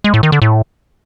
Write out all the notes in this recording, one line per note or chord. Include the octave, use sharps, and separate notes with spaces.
G#3
A2
D#3
D3
A2